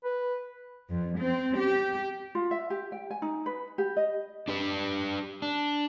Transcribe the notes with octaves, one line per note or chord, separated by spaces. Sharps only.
B4
F2
C4
G4
F4
E5
G4
G5
G#5
D#4
B4
G4
D#5
D4 G4 B4
D4